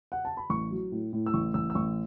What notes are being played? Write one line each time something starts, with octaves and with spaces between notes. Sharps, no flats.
F#5
A5
B5
A1 C#6
F#3
A2
A2
E6
A1 C#6
A1 E6
E6
A1 C#6